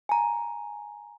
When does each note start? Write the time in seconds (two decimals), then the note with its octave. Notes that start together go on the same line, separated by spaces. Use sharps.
0.09 G#5 A#5